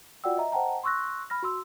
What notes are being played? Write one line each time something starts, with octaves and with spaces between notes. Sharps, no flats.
F4 F#4 D5 F#5 G5 E6
D#5 E5 A#5
C5 D#5 F#5 G5 A5 A#5
C6 C#6 E6 F#6 A#6
B5 F6 A#6
F#4 C6 E6